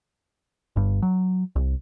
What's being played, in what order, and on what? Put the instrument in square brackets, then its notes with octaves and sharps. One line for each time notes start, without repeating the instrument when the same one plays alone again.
[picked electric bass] G1 G2
F#3
C2